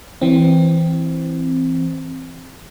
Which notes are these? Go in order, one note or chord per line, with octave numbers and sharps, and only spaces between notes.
E3 C4